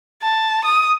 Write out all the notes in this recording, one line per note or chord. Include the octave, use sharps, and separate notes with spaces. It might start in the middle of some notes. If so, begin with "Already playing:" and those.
A5
D#6